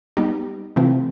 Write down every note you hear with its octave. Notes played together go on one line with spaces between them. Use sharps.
G3 B3 D#4 G4
C3 E3 A3 C4 F4